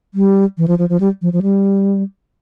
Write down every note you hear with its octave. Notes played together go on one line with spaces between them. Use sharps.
G3
E3
F3
F3
F3
G3
F3
F3
G3